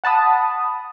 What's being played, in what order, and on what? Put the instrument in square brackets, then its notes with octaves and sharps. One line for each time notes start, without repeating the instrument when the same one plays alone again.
[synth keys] F#5 A5 B5 D#6